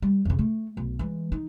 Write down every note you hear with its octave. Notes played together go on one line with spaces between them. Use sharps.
G3
F2 C#3
A3
B1
E3 G#3
D#4